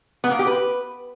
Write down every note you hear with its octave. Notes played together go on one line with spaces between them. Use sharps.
B3
A#3
G4
B4